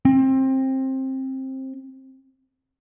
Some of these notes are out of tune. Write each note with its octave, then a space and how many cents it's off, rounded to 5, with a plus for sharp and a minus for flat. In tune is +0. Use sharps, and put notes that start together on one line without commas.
C4 +20